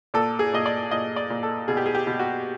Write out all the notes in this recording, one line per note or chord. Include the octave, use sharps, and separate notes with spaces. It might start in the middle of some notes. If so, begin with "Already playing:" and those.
A#2 A4
G#4
A#2 D#5
D5
A#2 D#5
D5
A#2
A4
B2 G#4
G4
G#4
G4
B2
F#4